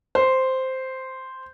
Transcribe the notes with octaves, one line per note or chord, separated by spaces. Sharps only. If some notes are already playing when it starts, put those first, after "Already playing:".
C5